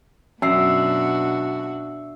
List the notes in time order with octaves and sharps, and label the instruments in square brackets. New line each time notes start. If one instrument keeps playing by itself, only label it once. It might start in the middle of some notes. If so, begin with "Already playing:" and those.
[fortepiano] F#2 [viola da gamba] B2 D4 F#4 [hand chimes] E5 E6 C7